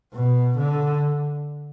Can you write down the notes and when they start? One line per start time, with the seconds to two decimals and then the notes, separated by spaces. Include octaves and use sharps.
0.14 B2
0.58 D3